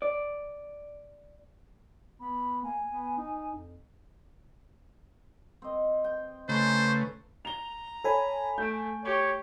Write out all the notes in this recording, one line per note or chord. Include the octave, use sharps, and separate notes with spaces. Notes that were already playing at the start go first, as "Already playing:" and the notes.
D5
B3 B5
A#3 G#5
B3
D#4
F2
C4 D#5
G5
C#3 A3 B4 C5 G#5 A#5
A#5 F7 G7
A4 C#5 G#5 B5
A3 G6 D7
G4 C#5